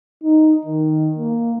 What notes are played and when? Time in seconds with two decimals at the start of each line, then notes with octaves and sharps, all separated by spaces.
0.24 D#4
0.65 D#3
1.18 A#3